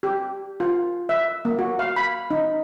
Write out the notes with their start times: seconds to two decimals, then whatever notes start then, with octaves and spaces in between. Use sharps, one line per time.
0.03 G4
0.60 F4
1.09 E5
1.45 A#3
1.59 F#4
1.79 F5
1.96 B5
2.31 D#4